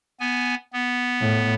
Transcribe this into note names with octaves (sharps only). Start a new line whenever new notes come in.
B3 G#5
B3
A2